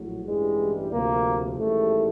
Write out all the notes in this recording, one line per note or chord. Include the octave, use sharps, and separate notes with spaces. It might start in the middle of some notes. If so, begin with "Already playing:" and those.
Already playing: A#1 A2 F#3
A1 G2 E3 G3 G#3
D2 C3 F3 A#3
A1 G#2 D#3 G3 A3